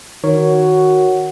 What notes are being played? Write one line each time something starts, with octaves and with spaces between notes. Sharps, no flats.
D#3 F#4 A#4 C#5